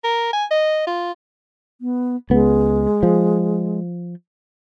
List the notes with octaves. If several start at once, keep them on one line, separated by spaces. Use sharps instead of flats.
A#4
G#5
D#5
F4
B3
C#2 G#3 B3
F3